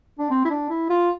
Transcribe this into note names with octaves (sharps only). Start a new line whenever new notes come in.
D4
C4
E4
D4
E4
F4